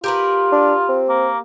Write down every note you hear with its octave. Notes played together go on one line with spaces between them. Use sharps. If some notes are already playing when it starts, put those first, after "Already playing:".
F4 G4 A#4 B4
D4
C4
A#3